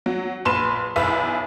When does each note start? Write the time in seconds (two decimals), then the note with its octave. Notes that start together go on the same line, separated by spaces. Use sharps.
0.06 F#3
0.45 A#1 B4 C6 E7
0.96 B1 E2 B4 E5